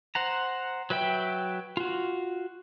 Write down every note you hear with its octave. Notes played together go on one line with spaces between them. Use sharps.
C5 F#5 A#5
F#3 B4 E5 G5
F4 F#4